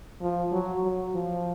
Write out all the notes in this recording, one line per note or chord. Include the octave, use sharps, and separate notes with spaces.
F3
F#3
F#3
F3